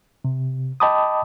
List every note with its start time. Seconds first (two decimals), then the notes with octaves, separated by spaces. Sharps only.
0.25 C3
0.80 D#5 G5 A5 B5 D6 D#6